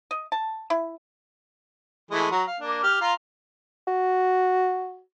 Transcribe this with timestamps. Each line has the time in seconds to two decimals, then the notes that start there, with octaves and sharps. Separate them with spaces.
0.11 D#5
0.32 A5
0.70 E4
2.11 E3 G#3 A3
2.31 F#3 A#5
2.47 F5
2.60 A#3 D4
2.83 G4 F6
3.01 F4 F5 A#5
3.88 F#4